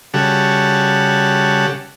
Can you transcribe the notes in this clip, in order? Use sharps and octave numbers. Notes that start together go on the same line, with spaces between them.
C#3 G3 F#4 A4